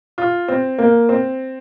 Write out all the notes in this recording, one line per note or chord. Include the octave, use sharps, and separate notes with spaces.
F4
C4
A#3
C4